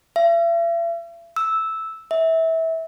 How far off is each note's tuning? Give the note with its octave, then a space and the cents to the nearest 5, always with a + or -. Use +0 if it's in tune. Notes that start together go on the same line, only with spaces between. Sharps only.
E5 +45
E6 -10
E5 -20